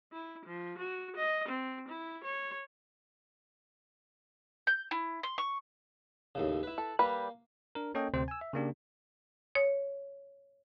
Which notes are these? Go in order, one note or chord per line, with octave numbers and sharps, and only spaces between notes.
E4
F3
F#4
D#5
C4
E4
C#5
G6
E4
C6
C#6
D#2 A2 C#3
E4 B4
A4
G3 A#3 B4
D4 A#4
A#3 C#4 A4 C#5 D#5 G5
D2 C3 C4 C5
G#5 E6
E5
C#3 A#3 D4 G4
C#5